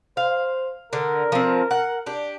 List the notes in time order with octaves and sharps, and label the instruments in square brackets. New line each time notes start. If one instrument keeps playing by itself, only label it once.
[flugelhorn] C5 [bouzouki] F5
[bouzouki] D3 [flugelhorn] A#4
[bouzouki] F3 C4
F#5
D4 G4